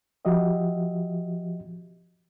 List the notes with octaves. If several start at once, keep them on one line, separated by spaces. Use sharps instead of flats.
F3 F#4 G4 D#5 E5